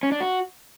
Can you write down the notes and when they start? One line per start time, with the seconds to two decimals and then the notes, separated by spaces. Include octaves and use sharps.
0.03 C#4
0.12 D4
0.20 F#4